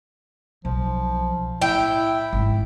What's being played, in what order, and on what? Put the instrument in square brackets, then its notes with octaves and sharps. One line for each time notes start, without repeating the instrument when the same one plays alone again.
[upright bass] B1 [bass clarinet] F3
[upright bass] A2 [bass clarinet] E4 [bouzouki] G5
[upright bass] G#1